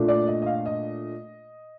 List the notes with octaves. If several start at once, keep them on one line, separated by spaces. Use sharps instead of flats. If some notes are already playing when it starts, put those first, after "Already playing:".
Already playing: A#2 A3 D4
D5
D#5
D#5
F5
D#5